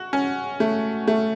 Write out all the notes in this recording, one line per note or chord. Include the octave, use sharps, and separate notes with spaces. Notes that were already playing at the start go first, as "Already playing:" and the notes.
Already playing: F#4
C#4
A3
A3